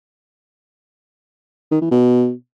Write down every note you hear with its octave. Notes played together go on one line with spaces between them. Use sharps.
D#3
E3
B2